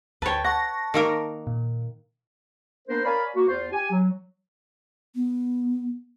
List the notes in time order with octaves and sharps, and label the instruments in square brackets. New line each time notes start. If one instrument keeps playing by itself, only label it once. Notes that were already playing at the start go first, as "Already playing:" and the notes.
[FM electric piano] D2 [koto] B4 C#5 [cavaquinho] G5 A5
[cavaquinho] F#5 [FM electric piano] A5 C#6 A#6
[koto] D#3 A#3 A#4
[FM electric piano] A#2
[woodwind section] A#3 B3 D4 A#4 C5
A#4 C#5 D5 F5 G#5 B5
A#3 F#4
E2 F4 C5
G4 G#5
F#3
[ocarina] B3